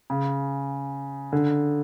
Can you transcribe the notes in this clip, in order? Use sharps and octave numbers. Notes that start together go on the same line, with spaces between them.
C#3
D3